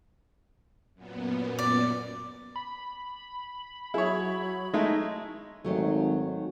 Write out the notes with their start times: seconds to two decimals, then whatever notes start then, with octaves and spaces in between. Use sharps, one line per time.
0.95 F#2 A#2 B3
1.59 D5
2.56 B5
3.94 F#3 E4 G#4 C#5
4.74 G#3 A3 D#4 E4 D#5
5.65 G#1 D#3 F#3 A3